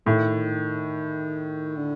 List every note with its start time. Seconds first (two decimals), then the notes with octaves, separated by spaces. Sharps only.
0.06 A2 D#3
1.77 D3